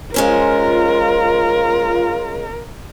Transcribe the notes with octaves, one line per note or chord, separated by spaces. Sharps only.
G#3 C#4 F4 A#4 C5